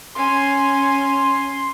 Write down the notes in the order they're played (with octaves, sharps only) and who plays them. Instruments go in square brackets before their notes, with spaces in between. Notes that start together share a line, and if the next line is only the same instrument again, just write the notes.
[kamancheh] C#4 G#5 [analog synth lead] C6